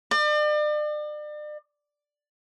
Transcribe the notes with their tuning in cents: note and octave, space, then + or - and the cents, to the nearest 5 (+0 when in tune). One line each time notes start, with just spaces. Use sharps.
D5 +40